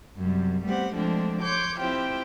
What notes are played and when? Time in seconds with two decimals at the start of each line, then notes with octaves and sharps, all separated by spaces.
0.19 F#2 C3 G3
0.65 G3 A3 B3 C4 G4 F#5
0.94 D3 F3 G#3 A3 C4 D4
1.43 C#5 C6 D6 G6
1.78 C4 E4 F4 G4 C5 G5